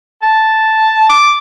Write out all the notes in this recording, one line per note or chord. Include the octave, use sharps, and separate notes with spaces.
A5
D6